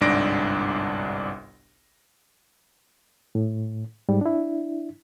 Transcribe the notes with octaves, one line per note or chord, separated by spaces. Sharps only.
G1 C2 G#2 D4 A#6 D7
A2
G#2 G3
D4 E4